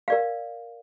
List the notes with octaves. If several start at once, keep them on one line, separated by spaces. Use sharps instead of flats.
A#4 D5 F5